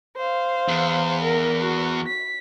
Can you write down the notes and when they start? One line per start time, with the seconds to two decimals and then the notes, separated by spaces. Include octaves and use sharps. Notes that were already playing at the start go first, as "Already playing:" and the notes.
0.17 C5 F5
0.68 E2
1.23 A#4
1.61 F#4
2.06 B6